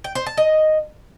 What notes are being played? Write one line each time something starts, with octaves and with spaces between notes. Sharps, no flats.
G5
C5
A5
D#5